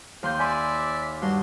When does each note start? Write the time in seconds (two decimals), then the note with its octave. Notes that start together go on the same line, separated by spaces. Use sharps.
0.23 D#2 C6 G6
0.39 D5 E5 G#5 B5 C6
1.22 G2 F#4 C6